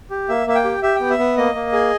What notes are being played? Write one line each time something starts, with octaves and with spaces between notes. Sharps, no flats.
G4
A#3 E5
A#3 E5
G5
G4
G4 E5
B3 G5
E5
B3
A#3 D#5
A#3
G#4